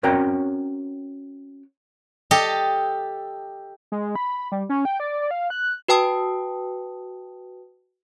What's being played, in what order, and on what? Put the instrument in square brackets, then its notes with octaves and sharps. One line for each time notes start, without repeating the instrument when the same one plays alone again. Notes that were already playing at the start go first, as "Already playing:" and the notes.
[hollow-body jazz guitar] C4 C#4 F#4 A#4 C#5 G5
[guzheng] G4 A4 D#5
[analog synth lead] G#3
B5
G3
C#4
G5
D5
F5
F#6
[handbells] F#4 B4 G5 A5 D#6